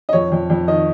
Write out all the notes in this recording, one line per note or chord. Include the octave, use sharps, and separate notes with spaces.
D#5
F2 C#5
F2
F2
D#3 D#5